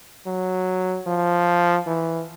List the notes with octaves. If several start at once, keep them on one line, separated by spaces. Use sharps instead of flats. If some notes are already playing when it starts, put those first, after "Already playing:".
F#3
F3
E3